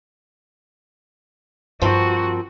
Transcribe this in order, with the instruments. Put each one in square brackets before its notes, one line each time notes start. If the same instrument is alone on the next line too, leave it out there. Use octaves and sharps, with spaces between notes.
[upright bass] G2 [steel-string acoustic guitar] F3 C4 A#4 [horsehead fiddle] F#4